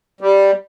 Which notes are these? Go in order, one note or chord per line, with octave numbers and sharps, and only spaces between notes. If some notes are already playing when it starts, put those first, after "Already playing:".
G3